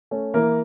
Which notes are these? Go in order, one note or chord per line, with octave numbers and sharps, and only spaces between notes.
A3 C#4
E3 A#3 A#4